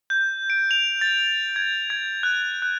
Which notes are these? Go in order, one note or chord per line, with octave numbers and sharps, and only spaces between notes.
G6
D7
F7
A6
G#6
G#6
F#6
F#6